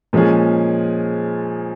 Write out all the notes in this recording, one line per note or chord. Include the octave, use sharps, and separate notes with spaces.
A#2 F3 G#3 C#4 G#4